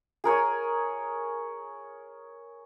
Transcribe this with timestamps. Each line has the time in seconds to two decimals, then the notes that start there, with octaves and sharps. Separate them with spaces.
0.24 G#4 A#4 C#5 G#5